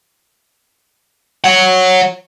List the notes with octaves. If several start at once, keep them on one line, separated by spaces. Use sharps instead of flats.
C#5 F#5